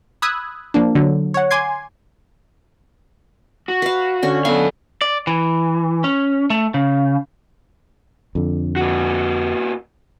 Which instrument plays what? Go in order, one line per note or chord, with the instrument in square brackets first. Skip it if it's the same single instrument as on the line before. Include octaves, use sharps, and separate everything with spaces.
[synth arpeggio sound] B5 D#6 E6 F#6 G#6
F3 A#3 D4
D3 F#3
C#5 F#5
G#5 C6 D6 G#6 C7
[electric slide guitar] F#4
[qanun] B4 F5
D3 C#4
[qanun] B3 G#5 [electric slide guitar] A4 F5
[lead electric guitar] D5
E3
C#4
A3
C#3
[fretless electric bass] F2 D3
[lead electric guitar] A#2 F#4